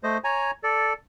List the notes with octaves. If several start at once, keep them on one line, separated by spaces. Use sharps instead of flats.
A3 C5 D#5
C#5 G#5 A#5
A4 D5